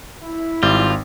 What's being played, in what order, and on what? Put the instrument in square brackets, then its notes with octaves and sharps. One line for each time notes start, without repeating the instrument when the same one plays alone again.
[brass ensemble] E4
[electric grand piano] G#1 [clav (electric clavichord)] G3 [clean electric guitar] F4